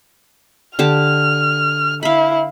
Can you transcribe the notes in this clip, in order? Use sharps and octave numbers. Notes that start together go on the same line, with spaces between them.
D3 G4 A5 F6
E4 F5 B5